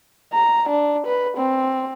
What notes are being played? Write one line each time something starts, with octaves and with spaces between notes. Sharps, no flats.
A#5
D4
B4
C4